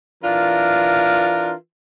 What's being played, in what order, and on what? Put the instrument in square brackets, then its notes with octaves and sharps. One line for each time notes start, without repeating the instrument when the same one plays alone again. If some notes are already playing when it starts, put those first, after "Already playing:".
[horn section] E3 D4 F4 A#4